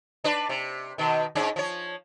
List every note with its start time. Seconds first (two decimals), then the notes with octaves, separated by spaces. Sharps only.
0.24 D4 B4 D5
0.49 C3
0.98 B2 D#3
1.35 G#2 C#4 D4
1.56 F3 C#5